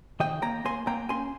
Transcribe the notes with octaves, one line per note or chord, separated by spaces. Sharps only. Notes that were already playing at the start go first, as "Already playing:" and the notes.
D#3 D#5 G5
A#3 G5 A#5
A#3 G#5 C6
A#3 G5 A#5
C#4 G#5 C6